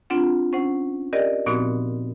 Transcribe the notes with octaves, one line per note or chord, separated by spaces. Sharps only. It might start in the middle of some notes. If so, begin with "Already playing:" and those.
C4 D4 F4 F#5
C#4 C5 F#5
G4 A#4 D5 D#5
A#2 F3 B3 C4 D#4 F#4